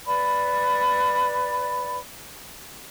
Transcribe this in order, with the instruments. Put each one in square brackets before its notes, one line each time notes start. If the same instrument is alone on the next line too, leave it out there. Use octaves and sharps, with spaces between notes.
[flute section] B4 D5 B5